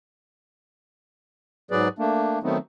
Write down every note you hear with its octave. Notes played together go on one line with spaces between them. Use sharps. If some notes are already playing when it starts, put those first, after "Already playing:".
G#2 F#3 G#4 B4 D5
A3 A#3 D4
D#3 F#3 A3 B3 C4 D#4